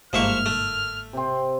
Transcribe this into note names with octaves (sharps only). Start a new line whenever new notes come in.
G1 G#2 F3 A#3 E5 C#6 F6
A3
C3 C4